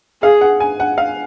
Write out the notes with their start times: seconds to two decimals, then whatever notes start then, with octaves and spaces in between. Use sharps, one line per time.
0.23 G#4 F5
0.41 F#5
0.60 G#5
0.80 F#5
0.98 F5